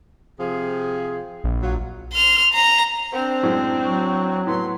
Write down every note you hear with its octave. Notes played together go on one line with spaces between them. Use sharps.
C3 F3 G#4
A#1
F#3 F4
C6 F6
A#5
C4 D4 C5
F#2 A2 G#3
F#3 C#6
A2 B3 C6